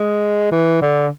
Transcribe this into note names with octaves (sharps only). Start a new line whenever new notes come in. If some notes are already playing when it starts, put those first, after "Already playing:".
Already playing: G#3
E3
D3